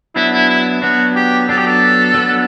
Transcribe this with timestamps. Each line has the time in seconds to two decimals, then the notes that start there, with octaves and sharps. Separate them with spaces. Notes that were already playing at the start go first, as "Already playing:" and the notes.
0.16 F#3 B3 D4 E4
0.33 E4
0.49 E4
0.82 F#3 B3 D4 F#4
1.16 G4
1.49 F#3 B3 D4 A4
1.58 G4
1.67 A4
2.14 F#3 B3 D4